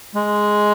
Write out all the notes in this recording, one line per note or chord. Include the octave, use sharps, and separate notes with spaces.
G#3